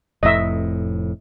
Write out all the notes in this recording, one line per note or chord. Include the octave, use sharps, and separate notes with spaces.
F1 F2 A2 D#5 E5